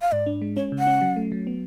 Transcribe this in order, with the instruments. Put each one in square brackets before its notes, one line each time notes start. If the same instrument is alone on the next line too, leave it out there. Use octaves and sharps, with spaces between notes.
[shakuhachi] F5
[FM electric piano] G#2 [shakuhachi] D5
[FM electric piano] D4
G#3
[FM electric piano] C#4 [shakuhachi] C#5
[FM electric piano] C#3
[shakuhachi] F#5
[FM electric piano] C#4
F#3
A3
F#3
B3